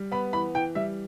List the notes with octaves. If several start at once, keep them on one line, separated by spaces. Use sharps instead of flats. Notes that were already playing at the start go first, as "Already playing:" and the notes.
Already playing: G3
B3 B5
E3 B5
E3 G5
G3 E5